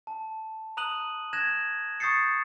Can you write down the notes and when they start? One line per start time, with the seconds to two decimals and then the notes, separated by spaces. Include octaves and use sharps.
0.07 A5
0.77 A#5 D#6 F#6 D#7 F#7
1.33 F#6 G#6 A#6 E7
2.00 C#6 D#6 G6 A6 C7 C#7